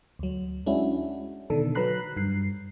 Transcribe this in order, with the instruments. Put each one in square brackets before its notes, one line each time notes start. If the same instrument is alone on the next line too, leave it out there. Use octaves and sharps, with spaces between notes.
[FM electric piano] D2 F#3
G#3 C#4 D4 E4 F#4
B2 D3 D#3 D4 A4
F#3 B4 A#5 B5 F#6 C7
G2 C7